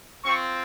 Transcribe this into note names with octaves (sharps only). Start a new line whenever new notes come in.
C4 F4 C#6